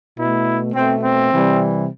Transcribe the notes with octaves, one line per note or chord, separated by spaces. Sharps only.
B2 A3 E4
B2 A3 C4
C4
C3 E3 G3